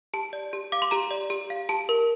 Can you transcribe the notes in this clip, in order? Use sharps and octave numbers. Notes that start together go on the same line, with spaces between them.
G4 A5
D5
G4
F5 D6
C6
G4 A#5
D5
G4
F5
G4 A5
A#4